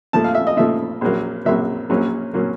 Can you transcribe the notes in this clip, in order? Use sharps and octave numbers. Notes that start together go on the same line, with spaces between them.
A#2 F3 A3 A5
F5
E5
D#5
A#2 F3 A3 E5
A#1 A#2 F#3 A#3
A#1 A#2 F#3 A#3 E5
A#1 A#2 F#3 A#3 C#4
A#2 F#3 A#3 C#4